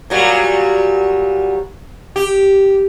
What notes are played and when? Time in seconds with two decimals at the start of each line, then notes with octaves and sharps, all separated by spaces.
0.10 A#2 F#3 G3
2.16 G4